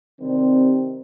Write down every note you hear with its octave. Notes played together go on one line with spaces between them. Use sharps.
C3 D#3 G3 C4